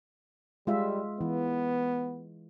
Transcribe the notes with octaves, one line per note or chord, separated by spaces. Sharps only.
G3 G#3 F4 E5
E3 B3